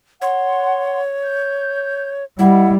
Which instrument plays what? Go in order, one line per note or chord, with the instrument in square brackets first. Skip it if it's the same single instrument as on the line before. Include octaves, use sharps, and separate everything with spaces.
[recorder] C#5 [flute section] F#5 C6
[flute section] G6
[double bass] G3 [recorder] E4 [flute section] D#5 F#5